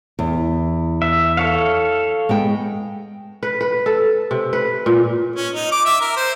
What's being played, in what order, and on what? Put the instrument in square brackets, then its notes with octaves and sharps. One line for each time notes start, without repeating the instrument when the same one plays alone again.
[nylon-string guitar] E2
[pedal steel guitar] E5
A4 C#5 F5
[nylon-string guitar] G#3 B3 G5
[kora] B4
B4
A4
C3
B4
A#2
[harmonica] C#4
D#4
D6
E5
A#4
C5